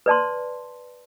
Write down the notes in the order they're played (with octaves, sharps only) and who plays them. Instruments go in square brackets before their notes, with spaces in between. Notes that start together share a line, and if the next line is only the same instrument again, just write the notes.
[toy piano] B4 D5 A5 C6